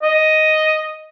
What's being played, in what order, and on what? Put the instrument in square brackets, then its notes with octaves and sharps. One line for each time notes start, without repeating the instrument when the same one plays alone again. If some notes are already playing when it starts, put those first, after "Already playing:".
[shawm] D#5